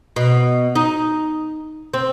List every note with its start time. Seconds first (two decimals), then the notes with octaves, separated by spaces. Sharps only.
0.16 B2
0.75 D#4
1.94 C4